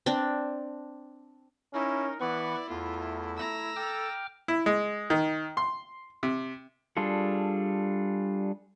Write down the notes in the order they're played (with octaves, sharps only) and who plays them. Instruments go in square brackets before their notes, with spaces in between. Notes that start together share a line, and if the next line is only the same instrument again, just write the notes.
[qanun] C4 D4
[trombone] C#4 [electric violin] D#4 [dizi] E4 [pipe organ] A#4
[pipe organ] E3 B4 C#6 [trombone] B3 [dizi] E4 [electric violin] D5
[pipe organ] E2 [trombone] A3 [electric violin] F4
[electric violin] A#5 E6
[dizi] A4 [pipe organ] G5 D6 F6
[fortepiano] E4
G#3
D#3
C6
C3
[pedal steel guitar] G3 D4 F4 G#4 A4